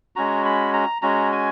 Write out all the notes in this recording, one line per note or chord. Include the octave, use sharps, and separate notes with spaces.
G#3 C#4 F#4 A#5
B5
A#5
G#3 C#4 F#4 A#5
G#5